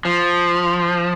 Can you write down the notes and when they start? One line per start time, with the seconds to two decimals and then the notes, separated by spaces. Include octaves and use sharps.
0.05 F3